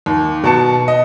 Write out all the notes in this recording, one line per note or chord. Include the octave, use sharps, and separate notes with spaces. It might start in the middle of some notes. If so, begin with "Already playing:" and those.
D#2
B2 A5 C#7
D#5